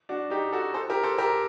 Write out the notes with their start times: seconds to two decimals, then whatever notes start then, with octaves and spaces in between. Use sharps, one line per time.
0.09 D4 F#4
0.30 D#4 G4
0.52 F#4 A4
0.74 A4 C5
0.90 G4 A#4
1.03 A4 C5
1.18 G4 A#4